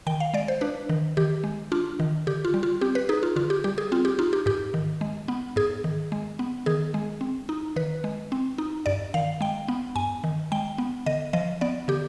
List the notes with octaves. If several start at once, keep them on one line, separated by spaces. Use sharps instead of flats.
D#3 G5
F5
G#3 D5
C5
D4 B4
D#3
D#3 G4
G#3
D4 F4
D#3
D3 G4
F4
G3
F4
C4 G4
B4
D#4 G#4
F4
D3 F4
G4
G3 G4
G#4
C4 F4
G4
D#4 F4
G4
G#2 G4
D#3
G#3
B3
G#2 G#4
D#3
G#3
B3
D#3 G#4
G#3
C4
D#4
D#3 B4
G#3
C4
D#4
G2 D5
D#3 F5
G#3 G5
B3
G2 G#5
D#3
G#3 G5
B3
D3 D#5
F3 D#5
B3 D5
D3 G4